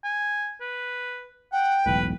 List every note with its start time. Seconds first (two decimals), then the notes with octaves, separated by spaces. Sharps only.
0.04 G#5
0.61 B4
1.52 F#5 G5
1.86 E1 B1 A2 B4